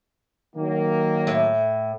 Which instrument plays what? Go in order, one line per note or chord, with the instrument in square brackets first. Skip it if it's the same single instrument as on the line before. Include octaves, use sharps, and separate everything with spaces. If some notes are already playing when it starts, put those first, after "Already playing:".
[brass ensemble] D#3 F#3 A#3
[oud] A2